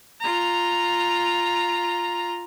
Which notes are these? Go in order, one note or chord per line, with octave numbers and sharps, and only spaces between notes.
F4 A#5